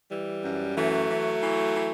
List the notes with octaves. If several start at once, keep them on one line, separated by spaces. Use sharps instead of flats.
E3 G3
F#2
E3 F#3 A3
E3
E3
E3